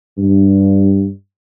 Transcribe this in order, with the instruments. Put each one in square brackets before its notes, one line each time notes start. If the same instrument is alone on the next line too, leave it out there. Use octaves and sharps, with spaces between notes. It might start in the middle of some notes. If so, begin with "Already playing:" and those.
[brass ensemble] G2